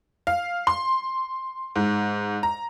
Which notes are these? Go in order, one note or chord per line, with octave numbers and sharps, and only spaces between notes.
F5
C6
G#2
A#5